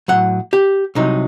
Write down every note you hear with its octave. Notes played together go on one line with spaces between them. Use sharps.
A2 F#3 F#5
G4
C2 C3 F#3 D#4